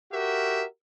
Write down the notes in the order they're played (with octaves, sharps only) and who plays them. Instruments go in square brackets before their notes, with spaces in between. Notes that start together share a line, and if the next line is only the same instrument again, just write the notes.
[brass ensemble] F#4 G4 A#4 E5